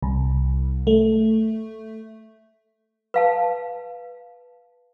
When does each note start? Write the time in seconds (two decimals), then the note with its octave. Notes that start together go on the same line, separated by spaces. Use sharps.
0.02 C2
0.87 A3
3.14 B4 F5 A5